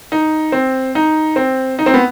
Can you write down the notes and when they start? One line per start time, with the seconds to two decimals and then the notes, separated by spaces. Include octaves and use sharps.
0.12 D#4
0.52 C4
0.95 D#4
1.36 C4
1.79 D#4
1.86 C4
1.94 B3